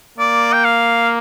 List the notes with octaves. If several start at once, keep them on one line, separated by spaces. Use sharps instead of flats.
A#3 D5
G5
F5